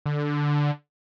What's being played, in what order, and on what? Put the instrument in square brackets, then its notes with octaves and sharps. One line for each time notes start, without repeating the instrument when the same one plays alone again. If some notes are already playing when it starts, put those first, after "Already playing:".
[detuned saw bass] D3